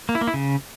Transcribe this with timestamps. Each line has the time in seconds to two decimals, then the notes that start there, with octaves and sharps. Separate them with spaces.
0.09 A#3
0.15 E4
0.21 A#3
0.28 E4
0.34 C#3